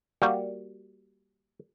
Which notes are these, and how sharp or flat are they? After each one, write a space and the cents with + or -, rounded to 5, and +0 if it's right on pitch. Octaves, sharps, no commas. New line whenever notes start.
G3 +0 A#3 +0 F#4 +0